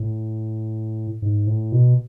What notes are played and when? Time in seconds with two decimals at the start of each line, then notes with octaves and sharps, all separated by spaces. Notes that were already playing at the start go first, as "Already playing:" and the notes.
Already playing: A2
1.22 G#2
1.47 A2
1.72 B2